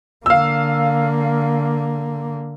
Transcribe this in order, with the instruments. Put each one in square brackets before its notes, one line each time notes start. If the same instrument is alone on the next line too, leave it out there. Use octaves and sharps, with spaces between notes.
[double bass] D3 A#3 [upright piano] F5 E6